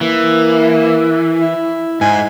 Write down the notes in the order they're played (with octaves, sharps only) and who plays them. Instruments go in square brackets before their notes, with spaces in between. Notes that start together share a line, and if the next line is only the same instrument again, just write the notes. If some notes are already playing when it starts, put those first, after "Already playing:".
[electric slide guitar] E3 [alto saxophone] A#3
[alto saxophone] E4
[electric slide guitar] G#2 [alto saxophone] G#5